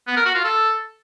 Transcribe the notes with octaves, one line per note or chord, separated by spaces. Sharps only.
B3
A#4
F#4
F4
A4